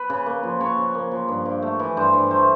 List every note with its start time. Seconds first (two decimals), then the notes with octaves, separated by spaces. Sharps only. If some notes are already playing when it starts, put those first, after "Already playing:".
Already playing: B4
0.10 C#3
0.26 A#3
0.43 F3
0.61 C#3 C#5
0.78 C#3
0.95 A#3
1.12 F3
1.28 G2
1.45 G2
1.62 A3
1.80 E3
1.97 G2 C5
2.14 G2
2.31 A3 C5